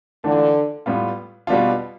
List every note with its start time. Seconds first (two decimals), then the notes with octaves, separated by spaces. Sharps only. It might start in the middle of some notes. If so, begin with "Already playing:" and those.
0.24 D3 E3 A3 D4 F4
0.86 A2 G3 B3 F4
1.47 B2 D3 G3 B3 D4 F4